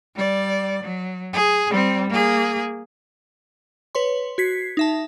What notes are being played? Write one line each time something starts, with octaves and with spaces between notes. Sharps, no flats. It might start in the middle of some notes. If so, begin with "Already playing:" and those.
G3 D5
F#3
G#4
G3 C4
A#3 G#4
B4 C#5 C6
F#4 G#6 B6 C7
D#4 E5 A5